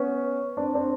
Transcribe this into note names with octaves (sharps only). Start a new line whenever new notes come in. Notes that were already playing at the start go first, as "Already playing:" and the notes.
Already playing: B3 C#4
C4 D4
C4 D4